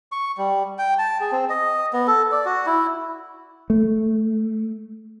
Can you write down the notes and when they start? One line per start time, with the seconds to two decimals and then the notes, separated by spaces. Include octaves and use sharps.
0.12 C#6
0.37 G3
0.78 G5
0.98 A5
1.20 G#4
1.32 C4
1.49 D#5
1.93 B3
2.07 A4
2.32 D5
2.45 F#4
2.66 E4
3.70 A3